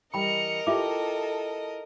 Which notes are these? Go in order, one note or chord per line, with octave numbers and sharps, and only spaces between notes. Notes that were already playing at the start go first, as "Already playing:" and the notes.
E3 G3 A#4 D#5 G5 B5 C#7 F7
E4 F4 G4 A4 E5 D6